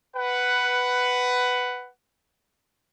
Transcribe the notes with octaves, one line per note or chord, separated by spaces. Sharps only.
B4 F#5